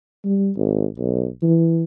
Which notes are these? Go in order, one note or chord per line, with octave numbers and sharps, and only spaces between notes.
G3
G#1
B1
E3